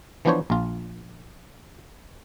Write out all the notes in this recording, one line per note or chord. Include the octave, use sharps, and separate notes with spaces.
E3 F3 B3 D4 C5 C#5
A#1 F4